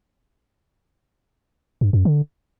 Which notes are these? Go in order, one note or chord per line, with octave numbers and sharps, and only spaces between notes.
G2
F#2
D3